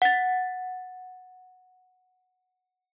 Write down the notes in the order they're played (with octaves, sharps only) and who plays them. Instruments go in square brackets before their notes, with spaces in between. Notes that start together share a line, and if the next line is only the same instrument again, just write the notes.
[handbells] F#5 A6